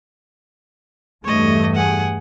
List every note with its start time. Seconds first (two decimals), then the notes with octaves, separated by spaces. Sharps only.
1.24 E2 G2 A3 C#5 D#5
1.76 G#4 F#5